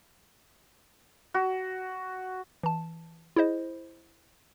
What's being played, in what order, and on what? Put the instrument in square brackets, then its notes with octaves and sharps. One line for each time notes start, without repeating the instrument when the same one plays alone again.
[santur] F#4
[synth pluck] E3 A5
E4 G#4 C5 D#5